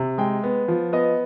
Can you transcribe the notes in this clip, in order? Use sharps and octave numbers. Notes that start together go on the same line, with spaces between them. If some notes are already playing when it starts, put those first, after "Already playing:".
Already playing: C3
G#3 G5
B3
F3
B3 D#5